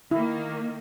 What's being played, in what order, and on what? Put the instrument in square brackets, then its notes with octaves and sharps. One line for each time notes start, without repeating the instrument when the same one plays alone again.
[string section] D#3 A#3 [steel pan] E4